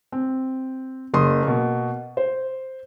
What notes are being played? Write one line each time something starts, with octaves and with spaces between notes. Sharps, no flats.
C4
F#1 C6 D#6
B2 A#3
C5